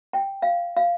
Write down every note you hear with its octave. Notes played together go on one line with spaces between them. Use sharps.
G5
F5
F5